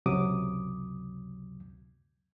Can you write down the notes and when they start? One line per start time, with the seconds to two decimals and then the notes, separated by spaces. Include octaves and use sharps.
0.06 C#2 F#2 C3 F#3 D6 D#6